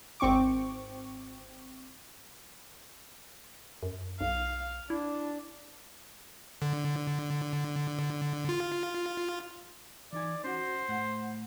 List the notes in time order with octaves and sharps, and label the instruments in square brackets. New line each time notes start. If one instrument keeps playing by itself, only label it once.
[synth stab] G#1 C4 C#6 D6
[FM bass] F#2
[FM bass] B1 [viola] F5
[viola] D4 [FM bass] E4
[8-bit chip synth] D3
F4
[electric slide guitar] E3 D#4 G#5 [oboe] D5
[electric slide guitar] C#4 F#4 [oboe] C5
[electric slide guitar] A2 F#5